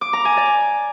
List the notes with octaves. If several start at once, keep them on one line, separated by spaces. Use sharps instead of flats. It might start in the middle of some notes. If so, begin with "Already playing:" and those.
D6
A#5
G#5
D5